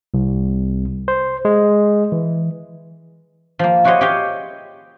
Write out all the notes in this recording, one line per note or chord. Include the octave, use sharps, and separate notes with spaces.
C2
C5
G#3
E3
F3 A#3
E4 F#4 G4 C5 C#5 D#5
G4 G#4 C#5 D#5 F5 G5